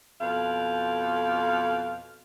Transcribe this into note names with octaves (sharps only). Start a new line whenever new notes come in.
F2 B2 F5